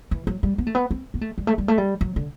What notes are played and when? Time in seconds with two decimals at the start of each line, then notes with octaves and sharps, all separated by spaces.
0.11 E3
0.27 F#3
0.43 G3
0.58 B3
0.67 A3
0.75 B3
0.91 C4
1.14 B3
1.21 A3
1.38 G3
1.47 A3
1.58 G3
1.68 A3
1.78 G3
2.01 F#3
2.16 D3